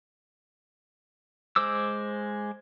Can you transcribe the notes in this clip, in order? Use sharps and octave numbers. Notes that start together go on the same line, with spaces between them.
G#3 C5 D6 E6